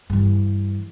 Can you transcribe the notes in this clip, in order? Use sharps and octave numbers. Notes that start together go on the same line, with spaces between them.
G2 E3